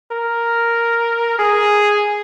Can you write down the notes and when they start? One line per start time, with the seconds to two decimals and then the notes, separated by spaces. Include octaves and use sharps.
0.12 A#4
1.38 G#4